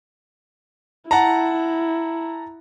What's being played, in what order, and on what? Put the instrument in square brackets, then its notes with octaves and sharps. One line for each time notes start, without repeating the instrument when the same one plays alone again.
[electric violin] E4 [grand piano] F#5 A5 A#5